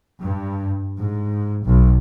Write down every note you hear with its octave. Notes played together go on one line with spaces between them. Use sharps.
G2
G#2
B1